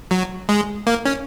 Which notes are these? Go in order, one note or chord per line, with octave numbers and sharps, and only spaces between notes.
F#3
G#3
A#3
C#4